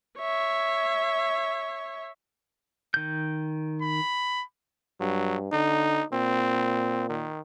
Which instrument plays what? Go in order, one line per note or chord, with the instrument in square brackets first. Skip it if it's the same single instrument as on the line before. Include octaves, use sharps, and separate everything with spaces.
[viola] C#5 E5
[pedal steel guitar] D#3 G6
[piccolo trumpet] B5
[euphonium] G2 [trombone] F#3
[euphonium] D3 [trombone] D#4
[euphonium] A#2 [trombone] C4
[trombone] D#3